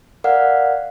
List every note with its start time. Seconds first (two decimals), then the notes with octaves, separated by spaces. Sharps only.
0.24 A#4 D5 F5 F#5 F6